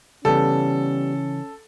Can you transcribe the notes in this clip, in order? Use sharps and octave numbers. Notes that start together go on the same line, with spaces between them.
C#3 E3 G3 B3 C#4 A4